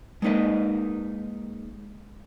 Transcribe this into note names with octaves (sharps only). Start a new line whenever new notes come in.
G#3 A#3 D#4 B4 D#5